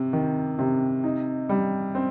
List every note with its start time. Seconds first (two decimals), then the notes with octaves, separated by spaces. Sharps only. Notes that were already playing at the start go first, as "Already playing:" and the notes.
Already playing: C3
0.13 D#3
0.59 C3
1.04 D#4
1.49 G3
1.95 C4